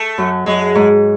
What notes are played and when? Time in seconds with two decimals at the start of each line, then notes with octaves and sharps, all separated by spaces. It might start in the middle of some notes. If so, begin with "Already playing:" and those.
Already playing: A3
0.18 F#2
0.46 F#2 G#3
0.75 G#2